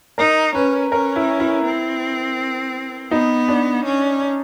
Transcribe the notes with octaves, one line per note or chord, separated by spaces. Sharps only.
D#4 A#4
C#4 B4
C#4 A#4
E4
E4
C4
B3 D#4
D4
C#4